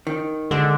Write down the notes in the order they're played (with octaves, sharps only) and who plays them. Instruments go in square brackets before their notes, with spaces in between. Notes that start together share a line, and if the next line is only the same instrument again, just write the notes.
[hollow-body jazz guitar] D#3
[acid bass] D3 [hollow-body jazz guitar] G#3